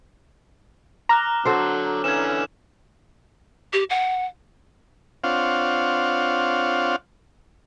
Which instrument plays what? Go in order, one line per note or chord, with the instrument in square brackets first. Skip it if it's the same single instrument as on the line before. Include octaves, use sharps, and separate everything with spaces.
[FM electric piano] A#5 [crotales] D6 F6 F#6
[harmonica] D3 F#3 [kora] F#4 A4 C5
[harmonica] D3 E3 C#4 [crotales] G#6 E7
[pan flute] G4
F#5
[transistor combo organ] C4 D4 F4 C#5 F5 F#5